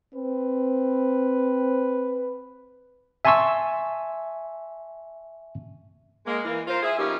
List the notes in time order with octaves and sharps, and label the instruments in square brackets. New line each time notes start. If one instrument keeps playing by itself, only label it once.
[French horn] C4 [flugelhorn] B4
[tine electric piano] E5 G#5 A5 C6 C#6 E6
[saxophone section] G#3 A#3
E3 A#3
F4 A#4 C5
G#4 E5
F3 A#3 B3 C#4 D#4 G4